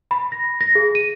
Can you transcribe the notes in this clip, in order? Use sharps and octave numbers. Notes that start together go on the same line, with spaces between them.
B5
A#6
A#6
G#4
D#7